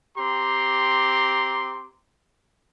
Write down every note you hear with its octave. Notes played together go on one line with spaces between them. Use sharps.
C4 G4 A#5 C6 D6